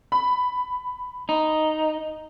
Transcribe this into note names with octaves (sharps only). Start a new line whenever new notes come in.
B5
D#4